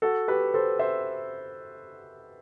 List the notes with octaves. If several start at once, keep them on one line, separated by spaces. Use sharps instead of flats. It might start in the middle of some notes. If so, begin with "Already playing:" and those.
F#4 A4
G4 B4
A4 C5
C5 E5